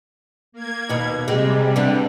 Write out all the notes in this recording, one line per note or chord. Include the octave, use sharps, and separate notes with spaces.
A#3 G#6
D#2 B2
C3 G3 G#3 G4
D3 E3 D4